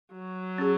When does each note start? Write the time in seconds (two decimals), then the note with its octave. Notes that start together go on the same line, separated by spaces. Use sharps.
0.12 F#3
0.58 C#4 G#4